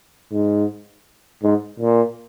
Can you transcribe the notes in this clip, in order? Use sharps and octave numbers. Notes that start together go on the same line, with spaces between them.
G#2
G#2
A#2